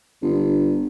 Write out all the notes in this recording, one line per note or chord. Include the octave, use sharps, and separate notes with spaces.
G1